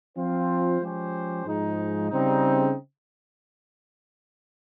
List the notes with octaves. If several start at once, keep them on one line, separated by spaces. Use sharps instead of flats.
F3 C4 F4 C5
F3 G#3 C#4 G4 C5
G#2 F3 G#3 D#4
C#3 G3 C4 D#4